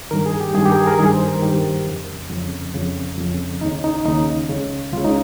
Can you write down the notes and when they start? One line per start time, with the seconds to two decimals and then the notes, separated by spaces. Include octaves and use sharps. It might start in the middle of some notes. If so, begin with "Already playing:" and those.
0.11 G2 D#3 A#4
0.26 G#4
0.40 G4
0.55 G2 D#3 G#4
0.65 G4
0.72 A#4
0.77 G#4
0.87 A#4
0.99 G2 D#3 G#4
1.13 C5
1.28 A#4
1.42 G2 D#3 G4
1.86 F2 C#3
2.30 F2 C#3
2.74 F2 C#3
3.18 F2 C#3
3.61 D#2 C#3 D#4
3.84 D#4
4.05 D#2 C#3 D#4
4.49 C#2 C#3
4.93 C#2 C#3 F4
5.05 D#4